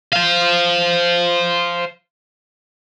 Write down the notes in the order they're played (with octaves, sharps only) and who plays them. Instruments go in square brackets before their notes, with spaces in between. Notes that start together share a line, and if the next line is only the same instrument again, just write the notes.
[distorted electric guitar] C5 F5